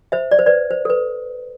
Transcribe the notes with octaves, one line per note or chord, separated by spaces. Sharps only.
C5 E5
D5
C5
B4 D5
C5
A4
B4